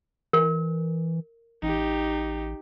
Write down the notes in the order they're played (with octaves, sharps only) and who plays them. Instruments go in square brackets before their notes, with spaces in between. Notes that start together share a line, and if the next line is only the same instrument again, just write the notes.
[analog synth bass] E3 [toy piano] A#4
[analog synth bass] A1 [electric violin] D#4 G4